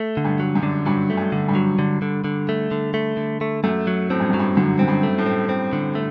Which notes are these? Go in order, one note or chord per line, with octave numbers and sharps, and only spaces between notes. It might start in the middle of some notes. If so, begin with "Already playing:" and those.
Already playing: A3
D3
G2
F#3
F#2
D3
G2 F#3
A3
G2
D3
G2
F#3
D3
D3
D3
A3
D3
A3
D3
A3
F#2 A3
F#3
A2 C4
G2
F#2 F#3
G2
F#2 D3
F#2 C4
G2
A3
A2
C4
C4
D3
A3